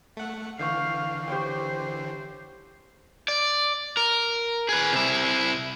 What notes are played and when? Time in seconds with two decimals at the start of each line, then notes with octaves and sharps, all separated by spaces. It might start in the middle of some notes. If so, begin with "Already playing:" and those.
0.17 A3 F#5
0.59 D3 E3 F5 C#6 G6 C7
1.28 G4 C5 C#5 G5
3.28 D5
3.97 A#4
4.69 G#4 B4
4.93 C3 E4